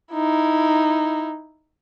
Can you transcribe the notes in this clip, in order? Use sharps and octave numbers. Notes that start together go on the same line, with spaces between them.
D#4 E4